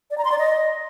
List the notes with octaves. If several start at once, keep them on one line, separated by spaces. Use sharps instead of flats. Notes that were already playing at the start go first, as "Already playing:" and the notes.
D5
A#5
C6
D5
D#5